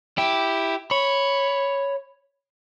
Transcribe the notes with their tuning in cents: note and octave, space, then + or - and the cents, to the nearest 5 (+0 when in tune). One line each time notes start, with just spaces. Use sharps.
E4 +0 G4 +0
C#5 +0 B5 +0